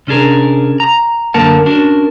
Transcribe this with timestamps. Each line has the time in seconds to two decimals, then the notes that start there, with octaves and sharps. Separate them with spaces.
0.07 C3 C#4 D4 G#4 A#4
0.80 A#5
1.34 F#2 D3 A#3 A#4 F#5 A5
1.66 C#4 D4 F#4 A#4